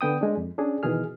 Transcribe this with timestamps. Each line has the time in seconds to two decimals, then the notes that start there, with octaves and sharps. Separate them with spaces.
0.01 D3 B3 G5 D#6
0.21 G#3 D4
0.37 F2
0.58 C#4 D4 G#4
0.83 B2 D#3 E3 G#4 F6